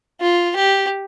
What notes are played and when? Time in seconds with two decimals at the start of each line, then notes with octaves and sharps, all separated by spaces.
0.21 F4
0.56 G4